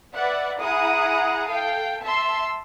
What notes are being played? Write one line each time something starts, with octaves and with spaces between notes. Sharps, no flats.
B4 D5 E5 F#5
E4 G#4 F#5 A#5 D#6
A4 F5 G5
E5 A5 C6 E6